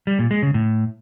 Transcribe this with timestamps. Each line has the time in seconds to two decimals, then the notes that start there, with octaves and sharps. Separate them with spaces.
0.07 G3
0.19 A#2
0.31 G#3
0.43 C#3
0.54 A2